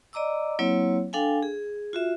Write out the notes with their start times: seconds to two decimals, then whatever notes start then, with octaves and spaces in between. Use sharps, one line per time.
0.13 D5 D#5 A#5 D6 E6
0.59 F#3 A#3 C4 E4 C#5
1.13 D4 A4 F5 G5 G#5
1.43 G#4
1.93 F4 F#4 E5